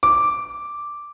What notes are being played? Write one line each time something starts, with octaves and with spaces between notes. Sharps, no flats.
D6